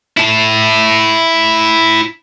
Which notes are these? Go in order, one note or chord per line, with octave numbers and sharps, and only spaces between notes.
E4 A5